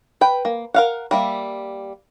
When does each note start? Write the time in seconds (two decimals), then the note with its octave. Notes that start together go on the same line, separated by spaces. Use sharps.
0.21 B4 G5
0.45 A#3
0.74 A#4 F5 F#5
1.11 G3 A#3 E5